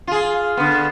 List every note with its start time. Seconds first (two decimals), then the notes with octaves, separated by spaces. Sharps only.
0.07 F4 G#4
0.57 D3 B3